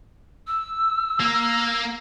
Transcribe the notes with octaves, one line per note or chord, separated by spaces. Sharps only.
E6
A#3